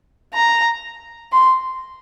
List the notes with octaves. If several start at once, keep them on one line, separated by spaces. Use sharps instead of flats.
A#5
C6